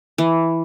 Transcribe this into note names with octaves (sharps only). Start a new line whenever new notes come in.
E3